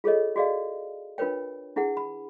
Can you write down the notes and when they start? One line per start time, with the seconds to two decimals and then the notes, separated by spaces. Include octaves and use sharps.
0.04 F4 G#4 A4 C#5 D#5
0.36 F#4 G#4 D5 D#5 F5
1.18 D4 F4 A#4 B4 C#5 G5
1.76 D4 E4 G#4 F#5
1.97 B5